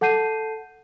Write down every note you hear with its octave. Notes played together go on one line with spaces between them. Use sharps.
A4 F#5 A5 G6 C7 D#7